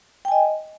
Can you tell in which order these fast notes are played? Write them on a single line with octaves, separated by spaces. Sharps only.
G5 G#5 D#5